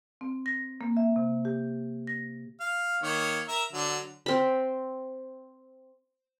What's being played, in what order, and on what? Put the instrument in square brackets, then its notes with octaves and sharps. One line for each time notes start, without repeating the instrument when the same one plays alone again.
[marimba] C4
A#6
A#3
E5
C3
G4
A#6
[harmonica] F5
D#3 A#3 C#5
A#4 E5
D3 F#3
[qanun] C4 B5